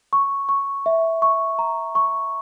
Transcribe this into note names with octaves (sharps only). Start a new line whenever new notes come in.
C#6
C#6
E5
C#6
A#5
C#6